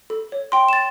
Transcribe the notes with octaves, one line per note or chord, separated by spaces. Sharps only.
A4
C#5
G5 C6
A6 E7